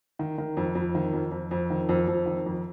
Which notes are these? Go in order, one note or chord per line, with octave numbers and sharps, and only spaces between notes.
D#3
D#3
F2
F2
D#3
F2
F2
F2
D#3
F2
F2
D#3
F2